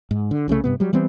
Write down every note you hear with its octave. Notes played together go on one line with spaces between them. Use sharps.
G#2
D3
C2 C#3 F#3 A3
G2 C3 B3
F#3 G3
E3 G3 B3 C4